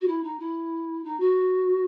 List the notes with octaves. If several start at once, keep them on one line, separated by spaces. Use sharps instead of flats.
F#4
E4
D#4
E4
D#4
F#4